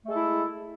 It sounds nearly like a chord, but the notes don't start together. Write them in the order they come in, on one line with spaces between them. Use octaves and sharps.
A3 G#3 A4 E4